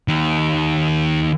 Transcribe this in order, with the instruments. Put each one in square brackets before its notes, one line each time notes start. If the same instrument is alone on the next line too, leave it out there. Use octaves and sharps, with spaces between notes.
[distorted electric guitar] D#2 D#3